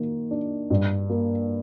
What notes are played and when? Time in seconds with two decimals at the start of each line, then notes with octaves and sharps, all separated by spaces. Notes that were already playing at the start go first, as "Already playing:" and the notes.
Already playing: D#3 A#3
0.31 D4
0.70 G2
1.09 A#3